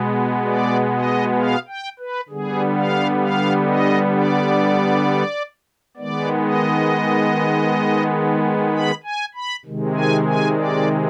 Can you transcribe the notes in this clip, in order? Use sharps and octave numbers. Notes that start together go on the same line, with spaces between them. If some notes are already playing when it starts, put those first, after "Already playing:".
Already playing: B2 G#3 B3
D5
D#5
F5
G5
B4
D3 G3 B3 G#4
F5
F5
D#5
D5
D#3 G#3 B3 D5
D#5
B5
G#5
B5
C3 D#3 G#3
G#5
G#5
D5